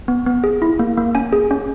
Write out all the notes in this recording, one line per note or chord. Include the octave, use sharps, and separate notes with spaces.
B3
B3
G#4
E4
A#3
A#3
C#4 G#5
G#4
C#4